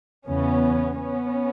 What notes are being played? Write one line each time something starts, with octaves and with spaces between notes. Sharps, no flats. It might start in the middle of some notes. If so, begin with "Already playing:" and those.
E2 C#3 E3 B3 C#4
B3 C#4